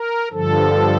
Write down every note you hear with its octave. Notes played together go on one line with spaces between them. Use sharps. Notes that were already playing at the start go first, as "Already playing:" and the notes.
Already playing: A#4
G2 D3 F3 A4